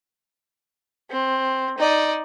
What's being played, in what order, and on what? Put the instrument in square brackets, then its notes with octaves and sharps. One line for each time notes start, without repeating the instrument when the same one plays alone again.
[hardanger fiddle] C4
D#4 D5